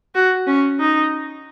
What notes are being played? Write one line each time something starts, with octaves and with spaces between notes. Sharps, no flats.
F#4
C#4
D#4